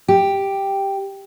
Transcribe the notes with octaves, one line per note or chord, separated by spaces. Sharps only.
G4